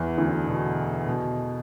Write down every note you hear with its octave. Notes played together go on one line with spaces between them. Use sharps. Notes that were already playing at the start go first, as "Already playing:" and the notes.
Already playing: E2 E3
D2 D3
B2
B2